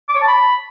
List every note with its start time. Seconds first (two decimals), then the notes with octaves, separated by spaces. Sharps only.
0.09 D6
0.15 C#5
0.21 A5
0.28 B5